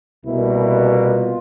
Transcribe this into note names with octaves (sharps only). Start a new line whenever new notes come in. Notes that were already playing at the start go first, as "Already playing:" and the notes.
C2 B2 G3 A#3 E4
F4